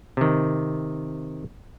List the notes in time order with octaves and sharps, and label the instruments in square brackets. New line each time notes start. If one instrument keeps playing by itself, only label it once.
[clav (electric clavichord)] C3 D#3